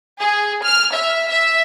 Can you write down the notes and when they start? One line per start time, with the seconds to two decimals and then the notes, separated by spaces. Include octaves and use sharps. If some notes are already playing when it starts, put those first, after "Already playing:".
0.19 G#4
0.64 F6
0.95 E5
1.29 E5